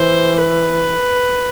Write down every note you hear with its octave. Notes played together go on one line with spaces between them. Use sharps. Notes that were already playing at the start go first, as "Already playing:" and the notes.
Already playing: E3 C5
B4